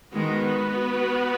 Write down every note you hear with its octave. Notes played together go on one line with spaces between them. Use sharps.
D#3 G#3 B3 F#4 B4